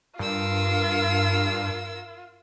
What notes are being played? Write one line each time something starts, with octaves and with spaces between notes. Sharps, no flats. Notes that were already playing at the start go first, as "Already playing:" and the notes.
G2 F4 A#4 E6